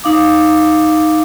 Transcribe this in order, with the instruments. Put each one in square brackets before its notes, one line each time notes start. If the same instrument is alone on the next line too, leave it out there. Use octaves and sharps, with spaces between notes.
[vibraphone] D#4 F5 D6